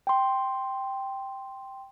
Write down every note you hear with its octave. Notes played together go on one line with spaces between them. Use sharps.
G5 C6